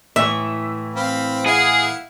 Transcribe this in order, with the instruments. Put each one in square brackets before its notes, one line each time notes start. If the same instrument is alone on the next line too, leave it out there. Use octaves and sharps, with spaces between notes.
[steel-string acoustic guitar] A2 E3 A3 [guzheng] E5
[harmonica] C4 F5 B5
[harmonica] E4 F5 F#5 [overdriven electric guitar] G#4